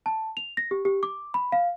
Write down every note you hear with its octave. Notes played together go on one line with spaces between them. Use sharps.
A5
F7
A#6
G4
G4
D6
B5
F5